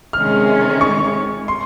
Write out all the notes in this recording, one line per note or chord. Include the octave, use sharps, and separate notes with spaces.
C3 D#3 G#3 C#4 F6
C#6
C6